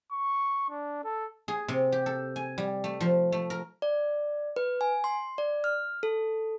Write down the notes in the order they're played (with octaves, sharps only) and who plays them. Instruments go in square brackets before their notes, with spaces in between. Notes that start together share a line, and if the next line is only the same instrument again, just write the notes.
[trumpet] C#6
D4
A4
[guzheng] G#4
C3
G4
A4
G#5
G3
A3
F3
A3
A#4
[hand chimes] D5
B4
G#5
C6
D5
F6
A4